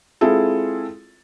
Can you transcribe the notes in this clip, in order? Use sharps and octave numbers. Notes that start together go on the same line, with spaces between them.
G#3 C4 E4 F4 G#4 A4